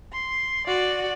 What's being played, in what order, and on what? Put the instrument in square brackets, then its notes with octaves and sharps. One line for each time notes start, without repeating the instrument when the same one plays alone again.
[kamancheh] C6
F#4 D5